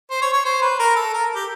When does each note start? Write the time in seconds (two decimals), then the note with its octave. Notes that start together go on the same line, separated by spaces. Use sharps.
0.10 C5
0.22 C#5
0.32 C#5
0.45 C5
0.61 B4
0.79 A#4
0.96 A4
1.13 A#4
1.35 G4